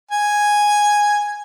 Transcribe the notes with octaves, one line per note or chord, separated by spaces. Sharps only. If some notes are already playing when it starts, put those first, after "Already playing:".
G#5